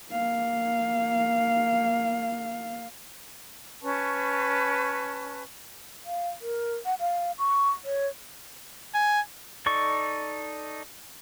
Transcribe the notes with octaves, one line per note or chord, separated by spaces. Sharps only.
A#3 F5
C#4 B4 A5 C#6
F5
A#4
F#5
F5
C#6
C#5
G#5
D#4 A4 D5 C#6